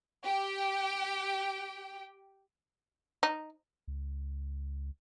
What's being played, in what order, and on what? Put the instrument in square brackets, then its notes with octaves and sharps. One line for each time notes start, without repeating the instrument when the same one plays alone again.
[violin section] G4 G5
[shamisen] D#4
[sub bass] C#2